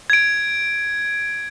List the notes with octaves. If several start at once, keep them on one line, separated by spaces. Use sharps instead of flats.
G#6 D7